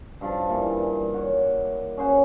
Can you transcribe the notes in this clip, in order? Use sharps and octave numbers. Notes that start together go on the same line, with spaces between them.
G2 F3 A5
A#2 E3
C#5 F#5
C#4 G#4 C5 F#5